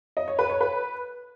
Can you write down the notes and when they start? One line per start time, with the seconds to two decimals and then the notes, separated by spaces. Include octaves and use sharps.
0.17 D#5
0.28 C#5
0.39 B4
0.50 C#5
0.61 B4